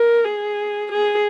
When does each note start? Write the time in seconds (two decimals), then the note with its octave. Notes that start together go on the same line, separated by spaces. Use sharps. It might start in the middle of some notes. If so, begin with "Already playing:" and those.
Already playing: A#4
0.24 G#4
0.91 G#4